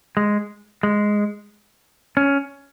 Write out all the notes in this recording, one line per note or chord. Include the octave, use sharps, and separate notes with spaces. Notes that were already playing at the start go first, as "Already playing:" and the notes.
G#3
G#3
C#4